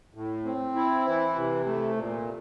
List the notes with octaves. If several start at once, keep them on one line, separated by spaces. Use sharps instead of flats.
A2
C4
E4
E3
C3
A3
A#2